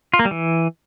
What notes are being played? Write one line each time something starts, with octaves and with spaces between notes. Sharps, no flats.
F4
A#3
G3
E3